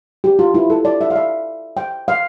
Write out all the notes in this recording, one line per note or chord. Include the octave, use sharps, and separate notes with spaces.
G4
F4
E4
A4
D5
E5
F5
E5
G5
F5